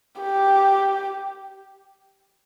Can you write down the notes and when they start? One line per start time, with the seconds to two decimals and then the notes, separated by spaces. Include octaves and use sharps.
0.21 G4